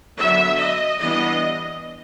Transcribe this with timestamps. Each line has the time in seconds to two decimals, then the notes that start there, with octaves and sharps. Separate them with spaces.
0.18 D3 F#3 B3 D4 E5
0.58 D#5
0.99 E3 G3 B3 D4 D#5